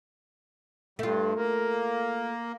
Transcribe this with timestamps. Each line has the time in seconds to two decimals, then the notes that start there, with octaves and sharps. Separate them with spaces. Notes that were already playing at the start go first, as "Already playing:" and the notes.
0.99 G2 A3 F4
1.36 A#3